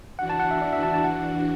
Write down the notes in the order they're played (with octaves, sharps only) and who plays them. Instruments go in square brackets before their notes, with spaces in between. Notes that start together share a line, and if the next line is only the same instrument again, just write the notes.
[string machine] E3 D4 F#4 [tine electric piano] F#5
[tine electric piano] A5
F#5
E5
D5
E5
A5
A5
F#5